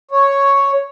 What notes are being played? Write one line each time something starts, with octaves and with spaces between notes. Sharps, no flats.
C#5